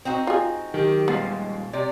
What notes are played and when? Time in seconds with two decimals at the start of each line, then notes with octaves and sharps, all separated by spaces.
0.05 C4 D#4 F#4
0.27 F4 G#4
0.74 D#3 F#3 G4
1.08 A#2 F3 G3 G#3 B3 A6 C7
1.73 C3 G4 D5